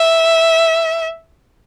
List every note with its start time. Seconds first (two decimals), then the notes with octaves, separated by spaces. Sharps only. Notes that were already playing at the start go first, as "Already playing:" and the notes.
Already playing: E5